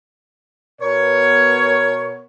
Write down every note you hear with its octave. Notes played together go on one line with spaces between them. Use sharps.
B2 B3 A#4 C#5